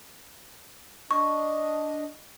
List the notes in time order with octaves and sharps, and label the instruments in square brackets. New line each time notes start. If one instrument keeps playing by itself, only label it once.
[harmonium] D4 D#5 [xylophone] C#6